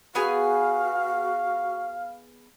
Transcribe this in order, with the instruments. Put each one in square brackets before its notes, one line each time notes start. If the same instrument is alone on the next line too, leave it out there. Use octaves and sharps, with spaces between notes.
[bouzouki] B3 G#4 G#5 [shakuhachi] F#4 [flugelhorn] F5